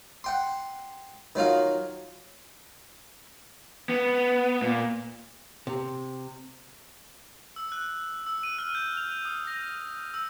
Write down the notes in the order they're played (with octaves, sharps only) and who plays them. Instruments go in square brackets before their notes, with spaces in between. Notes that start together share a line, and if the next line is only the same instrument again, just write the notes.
[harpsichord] F#5 G5 C6
D#3 F#3 F4 F5
[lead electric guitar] B3
A#2
[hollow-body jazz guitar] C3
[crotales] E6
F#6
E6
D#7
F6
G6
F7
D#6
A#6
E6